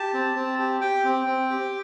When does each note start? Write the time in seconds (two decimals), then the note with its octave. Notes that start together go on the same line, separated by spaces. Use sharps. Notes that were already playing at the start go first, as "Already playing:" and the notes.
Already playing: G4 A5
0.14 C4
0.35 C4
0.59 G4
0.81 G4 G5
1.04 C4
1.27 C4
1.50 G4